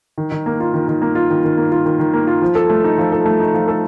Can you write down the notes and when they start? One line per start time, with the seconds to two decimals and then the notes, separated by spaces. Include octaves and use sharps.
0.18 D#3
0.32 D#3
0.46 A#3
0.60 F4
0.74 D#3
0.88 D#3
1.02 A#3
1.15 F4
1.30 D#3
1.44 D#3
1.57 A#3
1.72 F4
1.85 D#3
1.99 D#3
2.14 A#3
2.27 F4
2.42 F3
2.55 A4
2.70 A3
2.84 D#4
2.98 F3
3.12 A4
3.25 A3
3.40 D#4
3.54 F3
3.68 A4